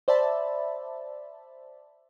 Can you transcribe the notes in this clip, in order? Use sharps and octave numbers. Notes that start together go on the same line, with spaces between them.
C5 D5 E5 A5 B5